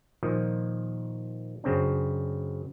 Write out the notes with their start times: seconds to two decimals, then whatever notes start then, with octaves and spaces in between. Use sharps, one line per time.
0.23 A#2 D#3 F3
1.64 F#2 C#3 C4 D4